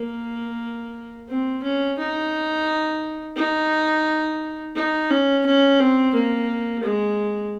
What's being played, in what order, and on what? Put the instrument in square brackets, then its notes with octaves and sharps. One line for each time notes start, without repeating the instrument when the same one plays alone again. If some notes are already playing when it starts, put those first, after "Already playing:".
Already playing: [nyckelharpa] A#3
C4
C#4
D#4
D#4
D#4
C#4
C#4
C4
A#3
G#3